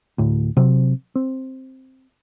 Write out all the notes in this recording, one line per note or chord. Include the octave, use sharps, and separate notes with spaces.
D2 A2
C3 F#3 C4
C4